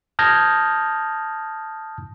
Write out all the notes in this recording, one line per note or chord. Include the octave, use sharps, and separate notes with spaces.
A5 D#6 F6 G6 G#6 A#6